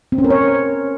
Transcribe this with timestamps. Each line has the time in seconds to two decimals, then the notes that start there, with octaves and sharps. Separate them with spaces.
0.12 C4
0.18 C#4
0.24 A#4
0.30 C#5